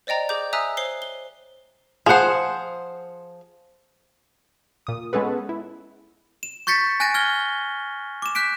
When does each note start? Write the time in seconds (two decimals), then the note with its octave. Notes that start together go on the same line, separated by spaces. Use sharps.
0.07 C5 D5 D#5 G5 A#5
0.29 G#4 D6 G6
0.53 E5 G#5 A#5 D#6 E6 F#6
0.77 C5 C#5 C7 G7
1.02 G7
2.06 F3 G#4 C5 F#5
4.87 A#2 D#6
5.13 G#3 B3 C#4 G#4 A4 B4
5.49 E4
6.43 E7
6.67 C#6 G6 A6 B6 C#7
7.00 G#5 F#6 A6 A#6 D#7
7.14 F6 G#6 G7
8.22 D6 E7
8.35 F#6 G6 B6 D7